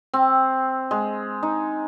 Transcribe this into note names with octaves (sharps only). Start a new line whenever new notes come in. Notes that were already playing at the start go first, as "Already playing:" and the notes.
C4
G#3
D#4